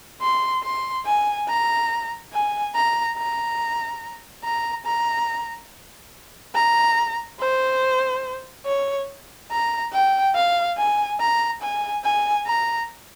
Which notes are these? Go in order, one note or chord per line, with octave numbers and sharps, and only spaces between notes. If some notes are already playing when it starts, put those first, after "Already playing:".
C6
C6
G#5
A#5
G#5
A#5
A#5
A#5
A#5
A#5
C5
C#5
A#5
G5
F5
G#5
A#5
G#5
G#5
A#5